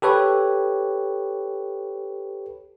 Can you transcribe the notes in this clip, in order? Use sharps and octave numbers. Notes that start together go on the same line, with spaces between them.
G4 A4 B4 C#5